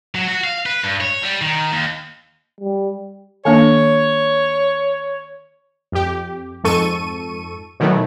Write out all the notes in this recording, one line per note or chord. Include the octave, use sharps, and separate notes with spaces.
F#3
F#4
F5
B4
G2
C#5
G3
D#3
D#2
G3
D#3 A#3 D4 C#5
F2 G4
F2 G#2 A4 C#6 D#7
B2 D#3 E3 F#3 A3